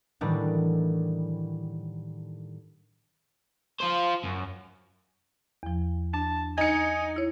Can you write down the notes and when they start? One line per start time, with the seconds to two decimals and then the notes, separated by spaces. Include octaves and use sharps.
0.21 A2 D#3 E3 F#3 G3 D4
3.80 F4 C5
4.24 F#2
5.63 E2 F3
6.14 D4 A5
6.58 D#4 G#5 C#7
7.16 E4 C#5